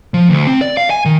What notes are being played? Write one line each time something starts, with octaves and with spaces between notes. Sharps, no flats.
F3
D2
C4
D5
F5
G#5
D#3